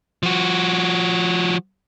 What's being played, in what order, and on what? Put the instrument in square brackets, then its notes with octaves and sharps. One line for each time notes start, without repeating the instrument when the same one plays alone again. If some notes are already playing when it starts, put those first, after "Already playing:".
[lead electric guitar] F3 F#4